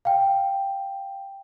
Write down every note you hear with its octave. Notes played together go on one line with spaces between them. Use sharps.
F5 G5